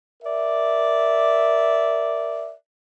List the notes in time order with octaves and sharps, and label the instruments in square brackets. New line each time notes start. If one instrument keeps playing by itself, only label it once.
[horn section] A#4 D5 E5